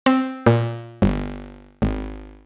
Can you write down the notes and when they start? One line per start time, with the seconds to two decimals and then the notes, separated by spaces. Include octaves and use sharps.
0.06 C4
0.46 A#2
1.02 G1
1.82 G#1